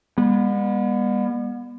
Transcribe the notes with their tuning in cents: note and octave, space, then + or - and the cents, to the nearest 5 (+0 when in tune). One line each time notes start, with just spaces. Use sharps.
G3 +45 B3 -35